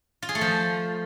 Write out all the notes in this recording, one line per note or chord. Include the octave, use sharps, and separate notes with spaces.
F4
G#4
A3
F3